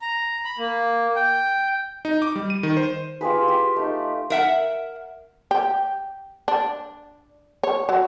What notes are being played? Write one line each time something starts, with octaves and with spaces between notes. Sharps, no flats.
A#5
B5
A#3
G5
D#4
D6
G3
D#7
D#3
C5
F4 G4 G#4 B4
G4
A3 D#4
A#4 E5 F#5
G4
D4
C#5
F#3